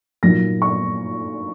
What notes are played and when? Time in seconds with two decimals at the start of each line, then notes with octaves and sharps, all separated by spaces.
0.23 A#2 F#3 A#3 D#4 A#6
0.62 C#6